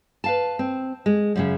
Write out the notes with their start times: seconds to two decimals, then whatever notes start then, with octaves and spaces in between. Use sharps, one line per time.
0.24 B4 F5 A5
0.59 C4
1.06 G#3
1.36 F#2 A#2 C#3